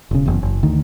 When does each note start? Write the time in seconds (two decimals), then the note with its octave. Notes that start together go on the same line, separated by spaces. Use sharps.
0.11 E1 C#3
0.26 F#1 E2
0.43 F#1
0.63 D2 D#3